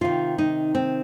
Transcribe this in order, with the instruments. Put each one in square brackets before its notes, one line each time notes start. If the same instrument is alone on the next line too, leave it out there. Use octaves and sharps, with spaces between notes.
[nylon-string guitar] C3 D#3 F4
D#4
C4